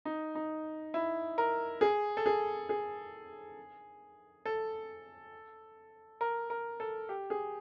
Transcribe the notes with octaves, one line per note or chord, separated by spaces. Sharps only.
D#4
D#4
E4
A#4
G#4
A4
G#4
G#4
A4
A#4
A#4
A4
G4
G#4